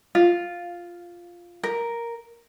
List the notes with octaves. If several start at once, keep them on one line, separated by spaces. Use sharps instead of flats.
F4
A#4